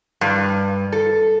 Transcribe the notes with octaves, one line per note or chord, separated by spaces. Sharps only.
G2
A4